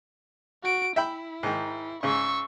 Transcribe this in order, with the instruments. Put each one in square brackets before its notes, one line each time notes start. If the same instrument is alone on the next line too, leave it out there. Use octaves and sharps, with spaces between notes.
[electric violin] F#4 D7
[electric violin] E4 [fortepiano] E5 G5 B5
[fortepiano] G#2 D#3
[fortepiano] G#2 C#3 [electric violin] C#6 E6